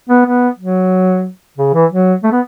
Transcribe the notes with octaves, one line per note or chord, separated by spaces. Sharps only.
B3
B3
F#3
C#3
E3
F#3
A3
B3